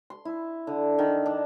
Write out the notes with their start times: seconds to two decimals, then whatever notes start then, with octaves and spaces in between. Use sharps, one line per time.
0.10 C6
0.25 E4
0.67 D3
0.99 D#3
1.26 D4